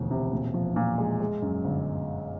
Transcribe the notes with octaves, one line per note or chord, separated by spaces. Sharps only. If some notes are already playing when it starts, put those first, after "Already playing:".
Already playing: E1 D2 F3
C3
A#2
F3
A#2
G#3
G#3
F#2
G1